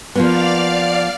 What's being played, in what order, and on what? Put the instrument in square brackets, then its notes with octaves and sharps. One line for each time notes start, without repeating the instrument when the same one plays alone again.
[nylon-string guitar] F3 A#3 B3 [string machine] D5 F5 F6